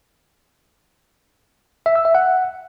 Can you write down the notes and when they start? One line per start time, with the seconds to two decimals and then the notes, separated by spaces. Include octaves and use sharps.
1.86 E5
1.96 E6
2.05 E5
2.15 F#5